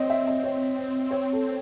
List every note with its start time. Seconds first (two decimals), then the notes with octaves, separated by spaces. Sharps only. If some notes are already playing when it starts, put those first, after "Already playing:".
Already playing: C4 C#5 D#5
0.10 E5
0.27 D#5
0.43 C#5
1.11 C#5
1.33 A4